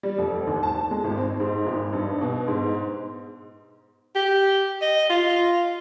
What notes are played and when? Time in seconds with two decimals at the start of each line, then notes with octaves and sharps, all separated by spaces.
0.03 G3
0.19 F1
0.47 D#2
0.63 A5
0.91 G#3
1.04 G#1
1.18 C4
1.40 G#2
1.66 G#1
1.93 G2
2.21 B2
2.48 G#2
4.15 G4
4.82 D#5
5.10 F4